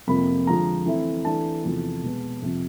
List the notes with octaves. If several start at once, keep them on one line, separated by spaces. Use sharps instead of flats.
F2 C3 F3 A#3 B5
D3 F3 G#3 A#5
E3 A3 C4 E4
E3 A3 D4 A5
E2 C3 F3 A3
B2 G#3 B3
F2 C3 F3